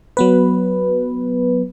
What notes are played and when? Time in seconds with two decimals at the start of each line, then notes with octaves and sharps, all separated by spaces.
0.17 F#3 B3 B4